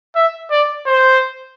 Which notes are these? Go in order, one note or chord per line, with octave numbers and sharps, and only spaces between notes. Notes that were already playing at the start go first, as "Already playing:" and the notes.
E5
D5
C5